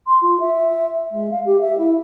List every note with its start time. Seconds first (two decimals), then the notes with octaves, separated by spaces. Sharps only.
0.06 C6
0.21 F4
0.40 E5
1.11 G#3
1.31 F5
1.45 G4
1.60 E5
1.77 E4